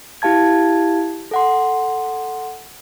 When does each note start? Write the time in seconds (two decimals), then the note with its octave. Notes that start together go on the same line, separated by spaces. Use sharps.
0.22 E4 G4 F5 A5 G#6
1.31 A4 F#5 C6